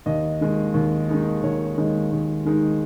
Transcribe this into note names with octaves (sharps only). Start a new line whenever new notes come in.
D#2 D#5
D#3 G#3 D#4
D#2
D#3 G#3 D#4
D#2 C#5
D#3 G#3 D#4
D#2
D#3 G#3 D#4